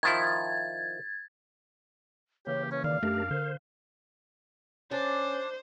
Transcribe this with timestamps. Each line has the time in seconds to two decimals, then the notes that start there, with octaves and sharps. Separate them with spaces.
0.03 D#3 F3 E4 G#6 A6
2.47 C#3 E3 A#3 G4 C#5
2.72 C#4 C#5
2.84 D#3 D5 F5
3.03 F#2 A3 D4 G4 A#4
3.31 D3 A#4 C5
4.91 C#4 D4 C5